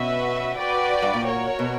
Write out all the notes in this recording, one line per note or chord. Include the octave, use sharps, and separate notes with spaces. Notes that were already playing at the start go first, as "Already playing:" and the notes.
Already playing: B2 C#4 F#4 B4 E5
F#4 B4 D5 G5
G2
A#2
F#4 A#4 C#5
B2